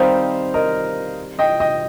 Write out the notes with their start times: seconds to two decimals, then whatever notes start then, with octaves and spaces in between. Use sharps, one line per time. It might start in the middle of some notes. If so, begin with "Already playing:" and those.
Already playing: D#3 G3 C4 D#4 C5 F5
0.54 A#4 D#5
1.39 D#5 G5
1.60 D#5 G5